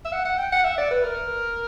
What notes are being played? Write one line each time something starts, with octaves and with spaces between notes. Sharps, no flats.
E5
F#5
F#5
G5
F#5
E5
D5
B4
A#4